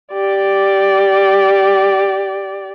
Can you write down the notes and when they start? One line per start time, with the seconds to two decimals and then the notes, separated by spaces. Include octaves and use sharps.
0.13 G4 D5